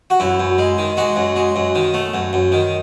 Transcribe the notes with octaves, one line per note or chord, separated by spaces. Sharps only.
F#4
F#2 E4
F#2
G#3
D#3
G#3 F#4
F#2
G#3
F#2
D#3
A3
F#2
F#2
D#3